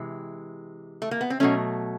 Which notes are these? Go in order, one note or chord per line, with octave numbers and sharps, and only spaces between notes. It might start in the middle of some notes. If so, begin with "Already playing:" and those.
Already playing: C3 E3 G#3
A3
A#3
B3
C4
B2 F#3 A3 C#4